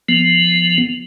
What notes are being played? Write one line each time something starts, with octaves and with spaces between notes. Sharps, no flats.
F3 B3